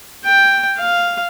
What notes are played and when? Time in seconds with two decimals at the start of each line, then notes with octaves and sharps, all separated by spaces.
0.25 G5
0.78 F5